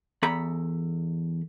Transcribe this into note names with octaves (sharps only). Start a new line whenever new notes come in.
E2 A4 A#5 B5